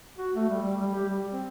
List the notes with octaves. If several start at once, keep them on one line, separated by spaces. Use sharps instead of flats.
F#4
A3
G3
G3
G3
G4
G3
C4